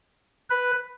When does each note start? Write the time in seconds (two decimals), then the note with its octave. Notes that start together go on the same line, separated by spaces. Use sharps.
0.50 B4